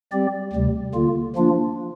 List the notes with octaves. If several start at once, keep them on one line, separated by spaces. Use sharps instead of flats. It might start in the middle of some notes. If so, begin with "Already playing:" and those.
G3 C4 G4 D5
D2 C3 G3
D3 A#3 F4
F3 A#3 D4 F4